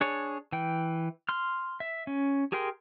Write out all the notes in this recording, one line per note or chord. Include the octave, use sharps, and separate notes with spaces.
D4 G#4 C#5
E3 G5
C6 F6
E5
C#4
G4 G#4 A#4 G5 C6